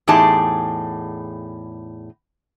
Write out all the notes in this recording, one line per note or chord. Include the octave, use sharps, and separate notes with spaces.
E2 A2 D#4 G4 G#4 A5